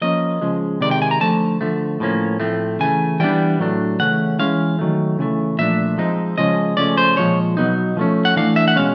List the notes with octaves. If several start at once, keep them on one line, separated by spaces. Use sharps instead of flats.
F3 A#3 C#4 D#5
C#3 F3 G#3
C3 D#3 G#3 D5
G5
G#5
A#5
D3 F3 A3 A5
D3 F3 A3
A2 F3 A#3 C#4
A2 F3 A3 C4
C#3 E3 A3 G#5
E3 G3 B3 D4 G5
A2 F#3 A3 D4
C#3 E3 A3 C#4 F#5
E3 G#3 C#4 F5
D#3 F#3 A3
C#3 E3 A3
A#2 F3 A3 D4 E5
F3 G#3 C4 D#4
C#3 F3 G#3 C#4 D#5
C#3 F3 A3 C#4 D5
C5
A#2 F3 G#3 C#5
B2 F#3 B3 D#4
F3 A3 C#4
F#5
E3 A3 D4 F5
E5
F#5
B2 G#3 C#4 F5